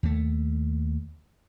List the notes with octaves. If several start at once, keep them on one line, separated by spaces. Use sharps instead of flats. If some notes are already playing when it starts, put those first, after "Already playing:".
D#2 A3